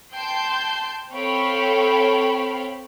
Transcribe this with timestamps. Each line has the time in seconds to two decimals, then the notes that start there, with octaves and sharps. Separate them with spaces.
0.13 G5 A5 C6 G6
1.13 C4 A4 C#5 F5 G5 B5